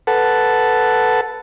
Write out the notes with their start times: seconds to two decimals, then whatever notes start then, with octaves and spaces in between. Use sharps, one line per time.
0.07 A4 B4 F#5 A5